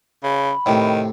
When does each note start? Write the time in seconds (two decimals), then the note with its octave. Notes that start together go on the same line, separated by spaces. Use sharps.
0.24 C#3 B5
0.66 A2 C3 D#3